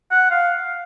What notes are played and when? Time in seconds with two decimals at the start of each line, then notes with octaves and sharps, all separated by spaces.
0.12 F#5
0.31 F5